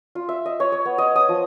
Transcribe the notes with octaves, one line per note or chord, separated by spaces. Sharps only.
F4
E5
D#5
C#5
C#5
B3
D#5
D#6
F3